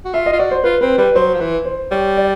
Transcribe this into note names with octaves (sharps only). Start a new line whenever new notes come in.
F#4
F4 E5
D#5
F4
F#4 D5
C5
F4 B4
C4 B4
G3 B4
F#3 C5
F3
E3 B4
C5
G3 C#5
D5